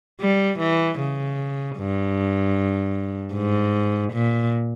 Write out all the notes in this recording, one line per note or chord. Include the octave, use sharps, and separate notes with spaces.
G3
E3
C#3
G2
G#2
A#2